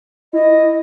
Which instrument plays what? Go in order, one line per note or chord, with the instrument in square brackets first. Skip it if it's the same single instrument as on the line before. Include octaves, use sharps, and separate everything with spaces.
[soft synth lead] E4 [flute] D#5